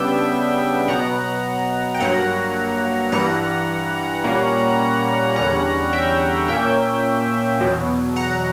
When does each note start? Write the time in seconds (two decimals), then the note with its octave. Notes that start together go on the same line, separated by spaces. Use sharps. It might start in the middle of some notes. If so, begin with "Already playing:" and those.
Already playing: C#3 G3 B3 D4 E5 G5
0.88 B2 F#3 B3 F#5 A#5
1.94 G5
2.00 G2 F#3 A#3 F#5 A#5
3.12 G2 E3 G3 F#5 A#5
4.24 A#2 G3 A#3 C#4
5.36 E2 D3 G3 C#4 F#5 A#5
5.93 E5 G5
6.48 A#2 A#3 C#4 E5 G5
7.60 E2 B2 F#3
8.16 F#5 A#5